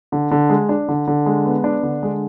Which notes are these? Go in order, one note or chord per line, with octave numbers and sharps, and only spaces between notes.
D3
D3
G#3
D4
D3
D3
G#3
B3
D4
D3
G#3